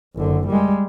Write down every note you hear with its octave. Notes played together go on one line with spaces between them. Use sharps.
F#1 D3
G3 G#3